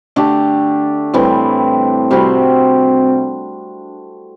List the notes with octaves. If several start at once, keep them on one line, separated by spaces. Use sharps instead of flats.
D3 A3 D4 G4
A2 E3 G3 C4
C3 G3 C4 F#4